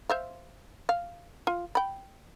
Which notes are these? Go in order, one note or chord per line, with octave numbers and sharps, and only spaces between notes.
C5 E5 F5
F5
F4
G5 B5